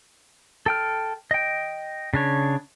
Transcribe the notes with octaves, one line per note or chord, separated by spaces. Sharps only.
A4 G5 F6
D#5 G5
C#3 D4 C#5